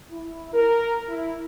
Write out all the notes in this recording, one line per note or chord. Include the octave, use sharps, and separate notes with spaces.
E4
A#4
E4